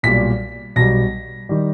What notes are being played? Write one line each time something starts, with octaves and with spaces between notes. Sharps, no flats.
B1 A#2 G3 B6
B1 B2 G3 A#6
D#3 G3